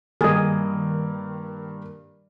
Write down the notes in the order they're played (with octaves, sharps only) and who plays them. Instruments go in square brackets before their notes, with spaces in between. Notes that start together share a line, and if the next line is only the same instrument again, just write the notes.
[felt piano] G2 A#3 [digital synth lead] D#3 [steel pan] G#4 D#5